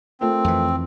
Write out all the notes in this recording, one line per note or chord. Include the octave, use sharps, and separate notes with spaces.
A3 C4 F4 A#4
F2 E3